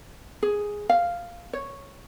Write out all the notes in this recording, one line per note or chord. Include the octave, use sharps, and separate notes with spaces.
G#4
F5
C#5